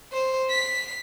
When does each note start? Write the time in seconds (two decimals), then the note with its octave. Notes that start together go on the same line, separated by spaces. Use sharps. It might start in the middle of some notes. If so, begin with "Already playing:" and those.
0.13 C5
0.50 B6 C7